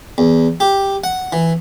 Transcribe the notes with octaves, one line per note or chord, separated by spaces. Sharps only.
E2
G4
F#5
E3